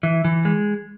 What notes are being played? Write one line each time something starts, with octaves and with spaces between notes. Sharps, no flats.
E3
E3
G#3